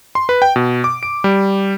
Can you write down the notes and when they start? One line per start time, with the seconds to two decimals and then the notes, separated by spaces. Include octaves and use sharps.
0.15 C6
0.29 B4
0.42 G5
0.56 B2
0.84 D6
1.03 D7
1.24 G3